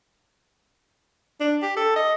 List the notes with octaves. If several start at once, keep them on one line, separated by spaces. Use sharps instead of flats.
D4
G4
A4
D#5